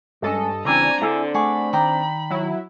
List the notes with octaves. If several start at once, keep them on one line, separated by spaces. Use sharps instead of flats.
G2 G#3 C#4 A4 D#5
C#3 E3 G3 C4 D4 G#5 A#5
D3 E4 G#4 E5
A3 G#4 F#5 B5 D6
D#3 D5 G5 A#5
F#3 E4